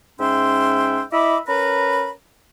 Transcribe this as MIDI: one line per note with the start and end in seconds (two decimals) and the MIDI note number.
0.19 1.01 44
0.19 1.01 61
0.19 1.01 76
0.19 1.01 79
0.19 1.01 84
1.12 1.38 64
1.12 1.38 75
1.12 1.38 76
1.12 1.38 83
1.12 1.38 86
1.47 2.10 61
1.47 2.10 70
1.47 2.10 71
1.47 2.10 82
1.47 2.10 83